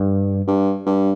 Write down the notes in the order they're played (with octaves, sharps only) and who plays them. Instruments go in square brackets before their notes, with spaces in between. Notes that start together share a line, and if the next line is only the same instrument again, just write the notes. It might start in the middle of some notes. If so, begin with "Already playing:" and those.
Already playing: [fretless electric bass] G2
[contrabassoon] G2
G2